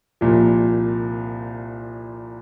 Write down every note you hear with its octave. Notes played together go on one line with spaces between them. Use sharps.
C2 A#2 F3